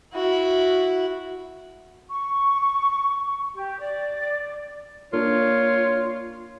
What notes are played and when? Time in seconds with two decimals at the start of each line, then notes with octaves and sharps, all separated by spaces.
0.14 E4 F#4
2.10 C#6
3.54 G4
3.79 D5
5.13 A#3 D4 F4 C#5